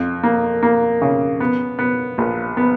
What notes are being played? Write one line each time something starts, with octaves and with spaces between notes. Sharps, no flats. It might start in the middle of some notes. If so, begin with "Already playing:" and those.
Already playing: F2
A#3
A#3
C#3
B3
B3
A#1
B3